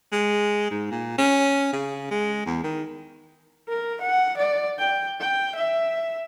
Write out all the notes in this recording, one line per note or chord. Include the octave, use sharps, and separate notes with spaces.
G#3
G#2
A#2
C#4
C#3
G#3
E2
D#3
A#4
F#5
D5
G5
G5
E5